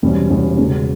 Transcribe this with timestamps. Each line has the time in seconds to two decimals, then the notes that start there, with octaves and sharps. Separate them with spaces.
0.02 E1 E2 C3 G3 C#4
0.30 E1 E2 C3 G3 C#4
0.58 E1 E2 C#3